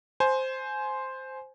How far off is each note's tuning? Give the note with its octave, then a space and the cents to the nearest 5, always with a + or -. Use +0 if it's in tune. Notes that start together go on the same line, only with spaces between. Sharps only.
C5 +0 G#5 +20